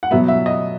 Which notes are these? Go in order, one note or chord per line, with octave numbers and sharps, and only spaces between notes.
F#5
B2 F#3 B3 E5
E5
D#5